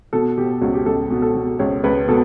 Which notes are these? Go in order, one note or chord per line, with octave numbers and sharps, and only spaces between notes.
B2 A4
B2 G4
C#2 F#4
G4
C#2 A4
B2
A4
B2
C#2 C#5
C#2 B4
B2 A4